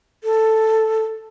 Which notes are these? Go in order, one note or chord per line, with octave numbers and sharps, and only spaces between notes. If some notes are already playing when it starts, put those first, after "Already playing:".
A4